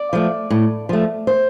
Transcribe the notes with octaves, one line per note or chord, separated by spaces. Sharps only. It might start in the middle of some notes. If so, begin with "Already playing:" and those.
Already playing: D5
F3 A3
A2
F3 A3
C5